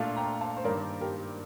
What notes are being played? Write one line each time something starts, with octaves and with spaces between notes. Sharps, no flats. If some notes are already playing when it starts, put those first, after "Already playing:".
Already playing: A#2 A3 D4 F4 F5 A5
G5 A#5
F5 A5
C5
G2 D#3 A#3 A#4 D5
G4 A#4